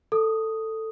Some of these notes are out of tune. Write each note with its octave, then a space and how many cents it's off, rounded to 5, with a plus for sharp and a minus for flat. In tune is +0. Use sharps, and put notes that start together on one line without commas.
A4 +10 D#6 +0